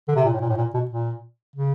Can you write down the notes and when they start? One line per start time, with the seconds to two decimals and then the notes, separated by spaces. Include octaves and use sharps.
0.08 D3
0.16 C3
0.25 A#2
0.33 A2
0.41 A#2
0.49 A2
0.58 A#2
0.74 B2
0.91 A#2
1.56 C#3